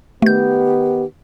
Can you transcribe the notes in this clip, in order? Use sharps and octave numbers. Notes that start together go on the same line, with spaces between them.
D#3 A3 B3 G4 G6